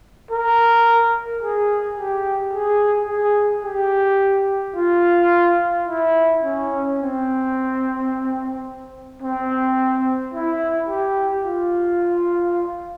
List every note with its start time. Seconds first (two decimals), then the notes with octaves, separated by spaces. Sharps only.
0.31 A#4
1.43 G#4
1.98 G4
2.53 G#4
3.09 G#4
3.64 G4
4.76 F4
5.88 E4
6.43 C#4
6.98 C4
9.22 C4
10.34 E4
10.89 G4
11.44 F4